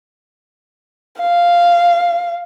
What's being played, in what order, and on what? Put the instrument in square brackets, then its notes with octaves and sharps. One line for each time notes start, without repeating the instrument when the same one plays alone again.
[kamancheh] F5